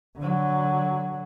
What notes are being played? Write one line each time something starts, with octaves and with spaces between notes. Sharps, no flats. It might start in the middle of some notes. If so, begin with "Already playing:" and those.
D3 F#3